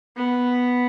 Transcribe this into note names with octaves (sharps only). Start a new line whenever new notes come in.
B3